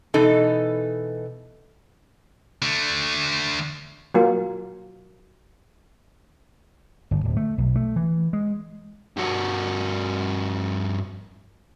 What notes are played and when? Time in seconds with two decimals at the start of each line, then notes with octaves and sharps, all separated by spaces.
0.14 B2 E3 D#4 A4
2.62 D3 A3
4.14 F#3 A#3 F4
7.11 G1
7.25 D1
7.37 A3
7.58 B1
7.76 A3
7.96 E3
8.33 G#3
9.17 G2 F#4